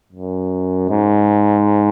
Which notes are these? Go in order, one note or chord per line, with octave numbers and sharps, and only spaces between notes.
F#2
G#2